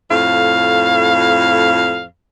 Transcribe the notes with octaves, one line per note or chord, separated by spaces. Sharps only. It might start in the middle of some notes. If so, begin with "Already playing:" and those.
F2 A2 F5